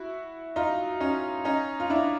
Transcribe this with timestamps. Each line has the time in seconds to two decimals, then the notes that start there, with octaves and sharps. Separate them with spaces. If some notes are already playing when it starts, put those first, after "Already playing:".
Already playing: E4 F#4
0.56 D#4 F4
1.00 C#4 D#4
1.45 C#4 D#4
1.80 F4
1.90 D4 E4